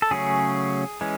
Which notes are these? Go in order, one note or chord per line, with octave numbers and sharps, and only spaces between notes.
A4
C#3 F#3 A3 C#4 G#4
E3 G#3 C#4